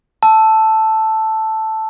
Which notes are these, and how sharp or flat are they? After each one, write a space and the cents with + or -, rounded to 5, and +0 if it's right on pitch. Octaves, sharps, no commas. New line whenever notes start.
A5 +0 E6 +0